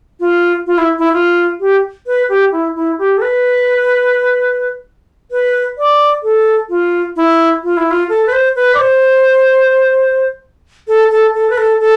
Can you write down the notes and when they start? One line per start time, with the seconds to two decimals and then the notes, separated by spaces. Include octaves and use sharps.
0.20 F4
0.67 F4
0.78 E4
0.99 E4
1.13 F4
1.60 G4
2.07 B4
2.29 G4
2.52 E4
2.76 E4
2.98 G4
3.18 A4
3.22 B4
5.31 B4
5.78 D5
6.23 A4
6.70 F4
7.16 E4
7.64 F4
7.77 E4
7.91 F4
8.09 A4
8.27 B4
8.32 C5
8.56 B4
8.75 D5
8.79 C5
10.88 A4
11.11 A4
11.34 A4
11.50 B4
11.58 A4
11.80 A4